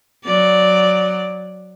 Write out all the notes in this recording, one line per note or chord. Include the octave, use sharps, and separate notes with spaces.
F#3 D5